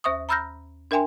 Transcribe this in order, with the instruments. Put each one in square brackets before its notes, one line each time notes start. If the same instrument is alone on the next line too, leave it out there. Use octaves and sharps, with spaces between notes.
[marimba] D#2 C5 E5 C#6 D#6
A#5 B5 E6 F6 G6 A#6
D4 A#4 E5 G5 G#5 C6